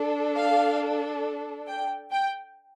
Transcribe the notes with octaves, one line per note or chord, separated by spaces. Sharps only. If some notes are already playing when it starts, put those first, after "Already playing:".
Already playing: D4 A4
F5
G5
G5